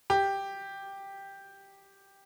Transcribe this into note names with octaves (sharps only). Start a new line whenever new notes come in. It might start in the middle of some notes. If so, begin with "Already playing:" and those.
G4